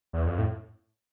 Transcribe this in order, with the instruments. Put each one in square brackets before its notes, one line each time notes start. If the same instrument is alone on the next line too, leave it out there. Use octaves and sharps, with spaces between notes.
[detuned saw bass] E2
F2
A2